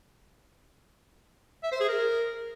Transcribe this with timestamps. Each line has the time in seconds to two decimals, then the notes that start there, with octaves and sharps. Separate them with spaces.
1.63 E5
1.72 C5
1.80 G#4
1.89 A#4